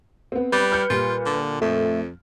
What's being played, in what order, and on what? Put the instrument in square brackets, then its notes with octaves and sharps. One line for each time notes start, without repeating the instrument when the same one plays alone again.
[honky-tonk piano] B3 C4
[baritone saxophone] G3 [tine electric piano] B4
[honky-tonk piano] F6 G6 C#7
[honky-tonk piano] A#2 G3 [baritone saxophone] F4
[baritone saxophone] D3
[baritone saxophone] F2 [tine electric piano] A3